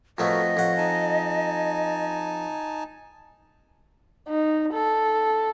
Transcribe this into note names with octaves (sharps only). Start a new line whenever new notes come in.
F2 A3 B3 F#4 A#4 D#5
F2 C#5 F#5
D#4 G#5 A5
D#4
A4